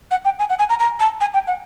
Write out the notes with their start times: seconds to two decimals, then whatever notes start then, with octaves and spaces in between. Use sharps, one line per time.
0.11 F#5
0.25 G5
0.39 G#5
0.49 F#5
0.59 G#5
0.69 A#5
0.80 A#5
1.00 A5
1.21 G#5
1.34 G5
1.47 F#5